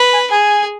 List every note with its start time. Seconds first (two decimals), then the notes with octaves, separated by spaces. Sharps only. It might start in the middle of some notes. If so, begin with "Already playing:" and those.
Already playing: B4
0.13 G#5
0.30 G#4 G#5